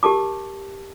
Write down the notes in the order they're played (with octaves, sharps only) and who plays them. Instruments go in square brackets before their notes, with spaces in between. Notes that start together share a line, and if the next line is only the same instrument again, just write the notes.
[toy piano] G4 A#4 A5 D6